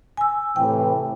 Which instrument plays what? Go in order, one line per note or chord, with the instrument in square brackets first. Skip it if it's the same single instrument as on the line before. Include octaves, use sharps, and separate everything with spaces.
[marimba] G#5 E6
[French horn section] A2 C3 E3 [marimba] G5